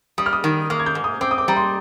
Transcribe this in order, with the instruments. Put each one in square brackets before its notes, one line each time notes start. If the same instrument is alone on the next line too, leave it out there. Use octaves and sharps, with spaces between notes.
[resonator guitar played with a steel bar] G3 [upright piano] D#6
[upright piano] F6
D#6
[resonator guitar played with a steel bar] D#3
[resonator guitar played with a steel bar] A#3 [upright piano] F6
[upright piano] G#6
G6
[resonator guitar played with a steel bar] G#2
[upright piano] D#6
[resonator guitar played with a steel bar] C4 [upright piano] D6
[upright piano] D#6
D6
[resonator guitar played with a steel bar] G3 [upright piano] A#5
[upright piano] C6